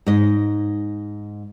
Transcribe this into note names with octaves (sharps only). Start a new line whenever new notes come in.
G#2 D#5